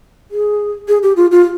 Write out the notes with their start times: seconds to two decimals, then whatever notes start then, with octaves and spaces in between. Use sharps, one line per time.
0.31 G#4
0.88 G#4
1.03 G4
1.16 F4
1.31 F4